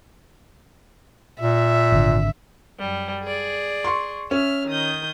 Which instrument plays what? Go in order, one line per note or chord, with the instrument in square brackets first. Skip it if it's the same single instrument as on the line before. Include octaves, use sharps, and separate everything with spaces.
[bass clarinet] A#2 [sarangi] E5
[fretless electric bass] G#1 D3
[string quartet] F#2 G3
G#4 D5
[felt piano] C6 C#6
[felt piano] C#4 [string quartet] E5 F6
[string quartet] D#3 D#6 G6